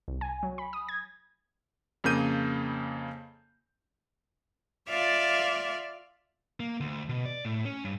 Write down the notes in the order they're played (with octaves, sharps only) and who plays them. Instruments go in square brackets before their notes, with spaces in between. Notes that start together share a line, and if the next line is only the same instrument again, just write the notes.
[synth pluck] C2
G#5
F#3
B5
D#6
G#6
[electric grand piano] F2 C#3 A#3 G6 D#7
[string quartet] F4 D5 E5 F5
[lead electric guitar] A#3
D2
B2
D5
A2
C#4
G2